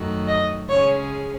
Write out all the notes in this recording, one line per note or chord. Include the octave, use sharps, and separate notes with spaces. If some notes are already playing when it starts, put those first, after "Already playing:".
Already playing: F#2 D#3 A3 D#4 F#4
D#5
C#3 G#3 C#4 G#4 C#5